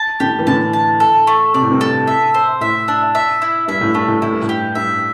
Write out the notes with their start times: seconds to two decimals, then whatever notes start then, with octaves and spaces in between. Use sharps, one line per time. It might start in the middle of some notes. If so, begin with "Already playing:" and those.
Already playing: A5
0.20 A2 D3 G4
0.39 E3
0.47 A2 D3 A5
0.73 A5
1.00 A4
1.27 A3
1.54 C3 D5
1.62 A2
1.71 G2 C3
1.81 A4
2.08 E5
2.34 C5
2.61 A2 E5
2.88 D4
3.15 E5
3.42 E4
3.68 G2 E5
3.81 A2
3.95 G2 A3
4.08 A2
4.22 A2 E4
4.32 G2
4.42 A2
4.49 G4
4.75 G2 E5